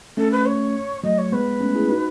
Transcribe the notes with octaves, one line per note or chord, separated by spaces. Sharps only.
A3 C#4 A4
B4
C#5
F#3 A3 D#5
C#5
G#3 B3 B4
A3 C#4
E4 G#4
D#4 F#4